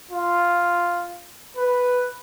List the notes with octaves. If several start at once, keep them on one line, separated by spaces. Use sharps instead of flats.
F4
B4